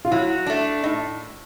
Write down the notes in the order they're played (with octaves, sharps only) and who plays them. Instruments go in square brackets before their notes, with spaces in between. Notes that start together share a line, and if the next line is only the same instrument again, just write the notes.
[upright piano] F4
[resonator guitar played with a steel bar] F#3 [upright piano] E4
[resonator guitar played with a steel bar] A3 D4
[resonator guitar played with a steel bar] A2 [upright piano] D#4